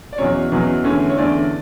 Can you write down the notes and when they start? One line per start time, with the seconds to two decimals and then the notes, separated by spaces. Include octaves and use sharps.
0.13 D5
0.18 E2 B2 F#3 C#4 C#5
0.52 E2 B2 F#3 C#4
0.84 E2 D3 A3 C#4
1.10 C#5
1.17 E2 D3 A3 C#4 D5